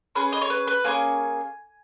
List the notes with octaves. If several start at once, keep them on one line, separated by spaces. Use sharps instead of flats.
C#4 G#4 B4
D#5
C#5
B4
B4
A#3 C#4 G#4 G#5